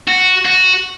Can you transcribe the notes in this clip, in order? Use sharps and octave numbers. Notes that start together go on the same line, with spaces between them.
F#4
F#4